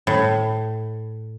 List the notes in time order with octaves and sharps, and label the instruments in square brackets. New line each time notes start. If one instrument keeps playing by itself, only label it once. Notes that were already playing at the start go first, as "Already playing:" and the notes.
[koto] A2